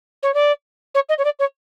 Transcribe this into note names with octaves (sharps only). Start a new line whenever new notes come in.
C#5
D5
C#5
D#5
C#5
D5
C#5